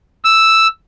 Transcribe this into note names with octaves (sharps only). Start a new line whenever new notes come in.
E6